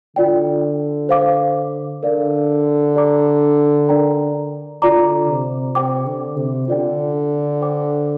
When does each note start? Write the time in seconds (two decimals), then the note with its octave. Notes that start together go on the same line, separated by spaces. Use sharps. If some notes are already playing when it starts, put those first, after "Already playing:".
0.16 D3 F4 D5 G5
1.09 C5 F5 D6
2.03 D3 A#4 D5 F5
2.96 G4 D5 A#5 D6
3.89 D4 A#4 D5 G5 A#5
4.82 D3 F4 D5 A#5 D6
5.28 C3
5.75 C3 C5 G5 D6
6.06 D3
6.36 C3
6.68 D3 F4 D5 G5
7.61 C5 G5 D6